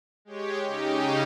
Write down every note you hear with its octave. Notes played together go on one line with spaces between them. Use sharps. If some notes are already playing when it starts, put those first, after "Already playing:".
G#3 G4 C#5
C#3 C#4 D#4 G4